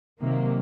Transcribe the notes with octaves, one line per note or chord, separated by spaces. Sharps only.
C3 D#3 F#3 A#3